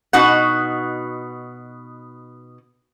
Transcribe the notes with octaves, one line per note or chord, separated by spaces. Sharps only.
B2 D#4 F#4 F#5